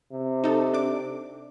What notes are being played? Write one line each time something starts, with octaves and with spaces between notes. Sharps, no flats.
C3
D#4 A4
D4 D6